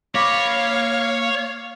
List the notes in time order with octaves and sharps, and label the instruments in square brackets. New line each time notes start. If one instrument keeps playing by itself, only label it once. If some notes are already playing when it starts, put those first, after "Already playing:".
[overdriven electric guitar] A#3 B5 [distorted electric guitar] C#5 [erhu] F5 [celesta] D6 A#6 B6